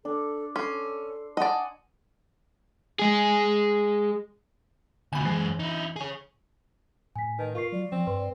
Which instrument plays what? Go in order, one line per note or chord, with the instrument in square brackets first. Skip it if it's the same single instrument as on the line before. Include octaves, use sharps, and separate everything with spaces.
[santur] D4 [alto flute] A4
[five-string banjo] C#4 [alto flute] A4 [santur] C6
[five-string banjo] D5 D#5 [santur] F#5 G#5 [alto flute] A5
[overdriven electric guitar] G#3 G#4
[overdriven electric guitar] D2 B2 [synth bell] G#5 B5
[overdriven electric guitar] F#2 G#3 [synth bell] E3
[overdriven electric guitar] D#4 E4
G#4 C#5
[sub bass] A2 [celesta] G#5 B6
[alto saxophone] D#3 [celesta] B4 A5 [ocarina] D#5
[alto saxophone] F4 [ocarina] A#4 [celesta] F5 C#6 C7
[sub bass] F#3 [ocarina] D5
[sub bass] F3 [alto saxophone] C4
[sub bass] G2 [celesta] B4 C6